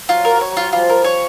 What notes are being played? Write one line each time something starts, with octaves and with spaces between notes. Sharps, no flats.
F#3 F4
A#4
F#3
C#5
F#3
F4
F3 G3 F4
A#4
C#5